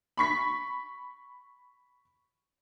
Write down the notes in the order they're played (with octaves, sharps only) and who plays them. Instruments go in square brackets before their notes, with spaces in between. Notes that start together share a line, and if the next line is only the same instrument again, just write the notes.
[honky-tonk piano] B5 C#6 B6